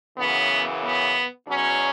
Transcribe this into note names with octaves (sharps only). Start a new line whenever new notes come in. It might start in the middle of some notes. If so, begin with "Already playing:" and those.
F#2 C#3 E3 B3
B3
E2 B2 F#3 C#4